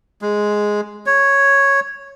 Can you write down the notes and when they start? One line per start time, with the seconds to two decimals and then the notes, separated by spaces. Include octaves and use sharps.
0.22 G#3
1.06 C#5